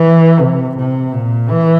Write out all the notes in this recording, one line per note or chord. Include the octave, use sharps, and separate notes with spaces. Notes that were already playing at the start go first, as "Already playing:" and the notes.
Already playing: E3
C3
C3
A#2
E3